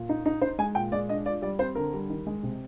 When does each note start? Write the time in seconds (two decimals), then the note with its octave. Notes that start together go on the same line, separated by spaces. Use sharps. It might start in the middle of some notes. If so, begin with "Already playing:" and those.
Already playing: A#2
0.09 D#4
0.26 D#4
0.41 D#4 C5
0.59 G#3 G#5
0.75 A#2 G5
0.92 G#3 D5
1.09 D4 D#5
1.26 F4 D5
1.42 G3 D5
1.59 C4 C5
1.75 D3 A#4
1.93 G3
2.10 D#3
2.27 G#3
2.43 C3